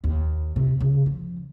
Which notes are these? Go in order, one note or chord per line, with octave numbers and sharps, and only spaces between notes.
D#2
C3
C#3
F3